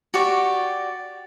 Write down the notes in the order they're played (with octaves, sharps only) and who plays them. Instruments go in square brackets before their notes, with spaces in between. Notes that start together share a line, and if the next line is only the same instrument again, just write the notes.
[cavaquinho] F#4 G4 D5 C#6